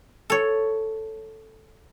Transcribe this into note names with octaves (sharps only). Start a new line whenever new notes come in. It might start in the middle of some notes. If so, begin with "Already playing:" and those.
A4 C#5